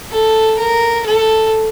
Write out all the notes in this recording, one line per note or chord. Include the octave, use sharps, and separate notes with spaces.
A4
A#4
A4